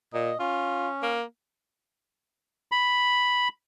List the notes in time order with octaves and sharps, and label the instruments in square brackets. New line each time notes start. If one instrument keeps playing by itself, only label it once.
[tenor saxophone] A#2 [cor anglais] D#5
[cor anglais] C#4 [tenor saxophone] F4
[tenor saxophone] A#3
[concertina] B5